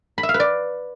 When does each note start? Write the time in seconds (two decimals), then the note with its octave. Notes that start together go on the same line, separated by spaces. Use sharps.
0.18 B5
0.23 E5
0.29 F5
0.34 B4
0.40 D5